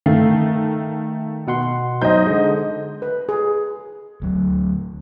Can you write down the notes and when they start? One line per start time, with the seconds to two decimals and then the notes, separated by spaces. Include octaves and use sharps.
0.06 D#3 A3 F5
1.47 B2 F#5 C6
2.02 F#3 D#4 C5 D#5 G6
2.27 D3 G#3
3.02 B4
3.29 G#4
4.22 D2 F#3